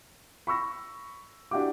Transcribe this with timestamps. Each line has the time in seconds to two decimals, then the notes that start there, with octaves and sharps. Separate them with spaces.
0.47 B5 C#6 E6 A#6
1.51 D4 E4 F#4 G4 D6